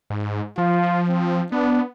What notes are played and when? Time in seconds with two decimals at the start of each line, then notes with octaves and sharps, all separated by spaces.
0.10 G#2
0.58 F3 F4
1.09 C4
1.52 B3 D4